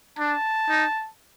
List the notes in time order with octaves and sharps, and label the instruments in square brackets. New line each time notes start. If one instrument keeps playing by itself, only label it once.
[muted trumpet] D4 [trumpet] A5
[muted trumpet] D#4